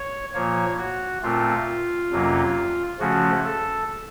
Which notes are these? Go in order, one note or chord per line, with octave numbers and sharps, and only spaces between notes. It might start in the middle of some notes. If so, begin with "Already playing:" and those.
Already playing: C#5
A#2 F3 A#3 C#5
F#4
A#2 A3 C4 F4
F2 C3 F#3 A#3 C#4
C#3 F3 A3 C#4 F#4
A4